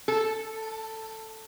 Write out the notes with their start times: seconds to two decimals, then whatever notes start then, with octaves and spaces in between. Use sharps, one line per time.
0.08 A4